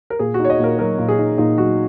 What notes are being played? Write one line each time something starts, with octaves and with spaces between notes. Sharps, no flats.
A#4
A#2 G#4
F#4
D#4
C#5
D#5
A#2 A#4
F#3 A#4
A#2
G#4
D#4
A#2 D#4
F#3 F#4